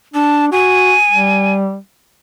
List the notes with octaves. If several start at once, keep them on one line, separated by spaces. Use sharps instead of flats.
D4 A5
F#4 G#5
G3